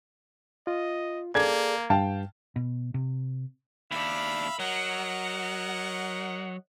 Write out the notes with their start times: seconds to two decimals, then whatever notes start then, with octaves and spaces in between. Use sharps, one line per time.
0.67 F4 D#5
1.35 A#3 G#4 A4 D5 G#6
1.90 G2 F5 G5 A5
2.56 B2
2.94 C3
3.91 D#2 D4 E5 F5 B5
4.59 F#3 A#4 D#5 F#5